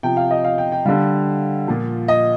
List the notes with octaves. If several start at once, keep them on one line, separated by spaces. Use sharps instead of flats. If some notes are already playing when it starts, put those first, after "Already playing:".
C3 F3 G5
F5
D#5
F5
G5
G5
D3 G3 F5
A#2 F3
D#5